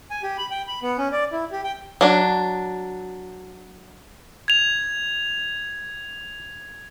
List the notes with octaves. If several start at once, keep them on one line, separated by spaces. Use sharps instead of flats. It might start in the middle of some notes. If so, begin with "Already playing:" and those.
G#5
G4
B5
G5
B5
B3
C#4
D5
E4
G4
G5
F#3 D4
G#6 F7